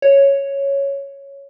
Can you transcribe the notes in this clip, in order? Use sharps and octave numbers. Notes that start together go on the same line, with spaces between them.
C#5